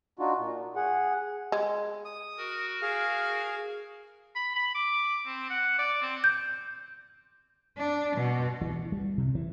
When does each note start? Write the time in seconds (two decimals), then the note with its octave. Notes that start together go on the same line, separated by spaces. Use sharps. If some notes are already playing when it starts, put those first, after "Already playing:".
0.19 D4 D#4 F4 F#4
0.38 A#2
0.76 G#4 F#5
1.52 G#3
2.05 D#6
2.38 F#4 A#4
2.82 G#4 F5
4.36 B5
4.56 B5
4.75 D6
5.26 C4
5.50 F#5
5.79 D5
6.02 C4
6.24 G6
7.77 D4
8.16 B2
8.61 E3
8.92 G3
9.18 C3
9.35 E3